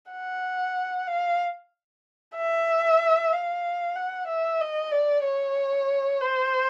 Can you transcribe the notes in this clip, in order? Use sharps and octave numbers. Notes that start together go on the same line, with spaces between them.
F#5
F5
E5
F5
F#5
E5
D#5
D5
C#5
C5